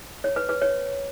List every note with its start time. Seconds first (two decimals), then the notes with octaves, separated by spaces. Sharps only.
0.24 C#5
0.36 B4
0.49 B4
0.62 C#5